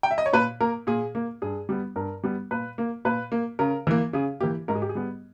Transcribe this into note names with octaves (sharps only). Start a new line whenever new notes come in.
G5
E5
D#5
C#5
A#2 B4
A#3 A#4
A#2 G#4
A#3
G2 G#4
G3 B3
G2 A#4
G3 B3
A#2 B4
A#3
A#2 B4
A#3
C#3 A#4
E3 A#3
C#3 G#4
E3 A#3 G4
G#2 A#4
G#4
G4
G#4
G3 B3